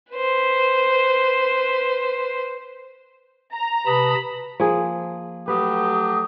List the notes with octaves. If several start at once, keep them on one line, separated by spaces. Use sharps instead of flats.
B4 C5
A#5
C3 B4 A5 B5 D#6
F3 A#3 G#4
F#3 A3 G4 B4 D#6